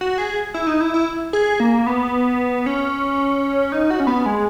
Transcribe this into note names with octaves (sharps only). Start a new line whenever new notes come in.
F#4
G#4
E4
D#4
E4
E4
G#4
A#3
B3
C#4
D#4
F#4
C#4
B3
G#3